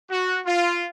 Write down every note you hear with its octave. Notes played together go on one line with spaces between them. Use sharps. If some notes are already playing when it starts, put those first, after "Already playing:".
F#4
F4